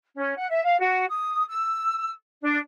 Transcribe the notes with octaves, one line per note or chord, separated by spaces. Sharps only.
C#4
F#5
E5
F5
F#4
D#6
E6
D4